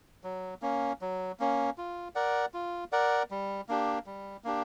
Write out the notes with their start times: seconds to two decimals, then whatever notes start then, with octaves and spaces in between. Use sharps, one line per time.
0.24 F#3
0.62 A#3 C#4
1.01 F#3
1.40 A#3 C#4
1.78 F4
2.15 A#4 D5 F#5
2.54 F4
2.92 A#4 D5 F#5
3.31 G3
3.69 A#3 D4 G4
4.06 G3
4.44 A#3 D4 G4